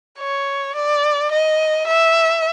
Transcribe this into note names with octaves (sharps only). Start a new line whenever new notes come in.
C#5
D5
D#5
E5